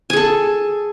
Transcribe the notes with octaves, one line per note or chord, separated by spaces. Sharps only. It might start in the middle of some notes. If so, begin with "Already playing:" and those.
G#4 A4 G#5